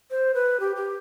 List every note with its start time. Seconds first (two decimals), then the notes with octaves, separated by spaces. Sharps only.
0.11 C5
0.34 B4
0.60 G4
0.76 G4